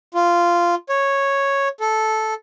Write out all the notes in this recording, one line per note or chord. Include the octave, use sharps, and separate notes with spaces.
F4
C#5
A4